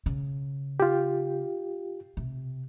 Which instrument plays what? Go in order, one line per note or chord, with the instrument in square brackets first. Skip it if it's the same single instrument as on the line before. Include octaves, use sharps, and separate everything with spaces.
[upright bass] C#3
[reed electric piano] F4 G4
[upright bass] C3